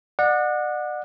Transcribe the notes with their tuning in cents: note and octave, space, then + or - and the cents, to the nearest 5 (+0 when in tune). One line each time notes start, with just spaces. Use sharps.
D5 +35 F#5 -20